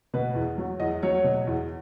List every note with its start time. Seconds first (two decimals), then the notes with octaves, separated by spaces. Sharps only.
0.14 B2 B4
0.35 E2
0.58 F#3
0.80 E2 D#5
1.03 F#3 C#5
1.24 B2
1.47 E2